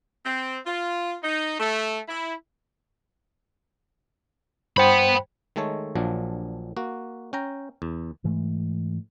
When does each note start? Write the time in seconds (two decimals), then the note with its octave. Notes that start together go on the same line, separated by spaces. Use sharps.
0.25 C4
0.67 F4
1.23 D#4
1.60 A3
2.08 E4
4.77 G2 C5 F#5 G5 B5
5.56 D#3 G#3 A3 A4 C#5
5.95 A#1 A#2 F3 F#3 D4
6.77 A#3 F#4
7.33 C#4 G5 A#5
7.82 E2
8.24 G#2 E3 A3